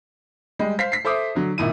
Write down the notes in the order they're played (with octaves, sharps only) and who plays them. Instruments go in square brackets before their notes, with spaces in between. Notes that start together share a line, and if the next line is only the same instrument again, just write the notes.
[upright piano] G3 G#3
C5 F5 B6 C7
B6 C7
A4 C5 E5 D6 D#6
D3 F#3
G#1 A#2 E4 D#7